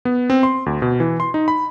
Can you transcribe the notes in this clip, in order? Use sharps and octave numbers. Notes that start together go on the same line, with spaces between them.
B3
C4
C6
D2
B2
E3
C6
D#4
B5